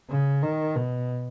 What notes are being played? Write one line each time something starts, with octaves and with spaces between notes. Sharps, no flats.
C#3
D#3
B2